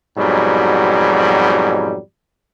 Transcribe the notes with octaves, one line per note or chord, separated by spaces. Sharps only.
F2 G#2 B2 F#3 G3